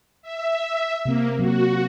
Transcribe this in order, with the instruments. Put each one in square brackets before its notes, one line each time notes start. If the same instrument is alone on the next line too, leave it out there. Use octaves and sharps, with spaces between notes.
[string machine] E5
[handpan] C3 C4 [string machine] A#3
[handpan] F#3 A#3 [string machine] F#4